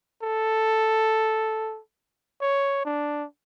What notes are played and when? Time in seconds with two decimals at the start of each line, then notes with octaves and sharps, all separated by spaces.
0.22 A4
2.41 C#5
2.85 D4